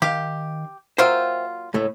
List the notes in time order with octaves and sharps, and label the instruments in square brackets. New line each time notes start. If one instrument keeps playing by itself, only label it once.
[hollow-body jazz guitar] D#3 F5 [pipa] G4
[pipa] F#3 A#3 F4 [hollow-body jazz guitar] C5 E5 G5
[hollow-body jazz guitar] C#2 A2 A3